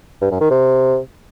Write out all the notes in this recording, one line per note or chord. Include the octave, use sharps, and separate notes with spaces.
G2
F#2
D#3
C3